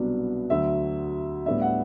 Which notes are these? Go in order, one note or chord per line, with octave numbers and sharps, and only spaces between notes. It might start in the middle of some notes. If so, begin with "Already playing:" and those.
Already playing: C2 B2 F#3 B3 D4
D2 D3 F#3 E5
A2 G3 B3 D4 E5
F#5